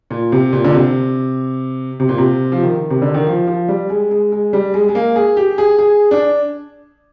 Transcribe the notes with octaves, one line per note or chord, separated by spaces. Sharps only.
A#2
C3
A#2
D3
C3
C3
A#2
C3
F3
D#3
C3
D3
D#3
F3
F3
G3
G#3
G#3
G#3
G3
G#3
G#3
A#3
G#4
G4
G#4
G#4
D4